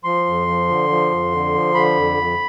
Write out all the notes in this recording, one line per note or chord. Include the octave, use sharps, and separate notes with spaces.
F3 C6
F2
F3
D3
F3
F2
D3
F3
D3 B5
F2
F2